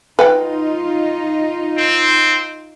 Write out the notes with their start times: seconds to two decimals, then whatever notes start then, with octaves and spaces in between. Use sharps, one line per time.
0.19 D#4 F4 B4 F#5 G5
1.78 C4